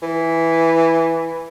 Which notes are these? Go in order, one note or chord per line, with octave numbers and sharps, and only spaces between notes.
E3